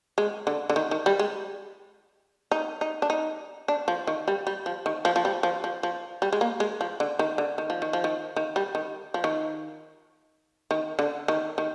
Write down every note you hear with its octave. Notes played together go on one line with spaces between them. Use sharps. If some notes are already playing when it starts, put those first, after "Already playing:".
G#3
D3
D3
D#3
D#3
G3
G#3
D#4
D#4
D4
D#4
D4
F3
D#3
G3
G3
F3
D#3
F3
F3
G3
F3
F3
F3
G3
G#3
A#3
G#3
F3
D3
D#3
D3
D#3
F3
D#3
F3
D#3
D#3
G3
D#3
F3
D#3
D#3
D3
D#3
D#3